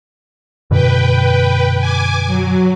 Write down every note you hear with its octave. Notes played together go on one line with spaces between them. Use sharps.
F#2 B2 D3 B4 G5
G#5 D6
F#3